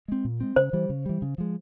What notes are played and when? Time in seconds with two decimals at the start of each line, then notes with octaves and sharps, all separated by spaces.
0.08 G#3 C4
0.25 A#2
0.40 G#3 C4
0.56 C#3 C5
0.73 E3 G3
0.89 C#3
1.06 E3 G3
1.22 C#3
1.38 F3 G#3